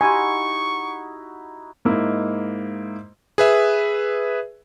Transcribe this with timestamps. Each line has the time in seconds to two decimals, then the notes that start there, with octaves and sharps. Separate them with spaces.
0.01 D#4 E4 F#4 G4 G#5 C6 C#6
1.85 G#2 A#3 D#4 E4
3.38 G#4 B4 E5